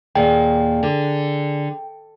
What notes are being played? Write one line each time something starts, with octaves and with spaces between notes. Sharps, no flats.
D#2 A#2 G#4 D5 G5 G#5
D3